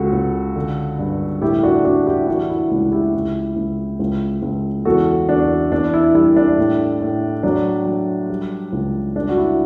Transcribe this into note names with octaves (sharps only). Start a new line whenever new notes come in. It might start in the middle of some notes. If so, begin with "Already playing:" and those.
Already playing: C#2 F#4 A4
C#2
D3
G2
A2 E4 G4
D4 F#4
G3 D4 F#4
E4 G4
E3 D4 F#4
E4
C#2 E4
E4 G4
C#2
C#2
C#2
C#2
E2 F#4 A4
E2 D4 F#4
E2 D4
E4
G3 E4
D4
A2
A2
F#3 D4
F#3
G3
C#2
G3 D4
F#4
E4